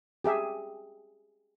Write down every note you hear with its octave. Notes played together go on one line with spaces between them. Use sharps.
G4 G#4 E5